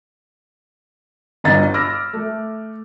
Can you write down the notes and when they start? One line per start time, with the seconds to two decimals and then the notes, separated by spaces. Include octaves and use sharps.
1.44 G1 G2 D#5 A#5 A6
1.74 B5 D6 E6 F6 A#6
2.13 A3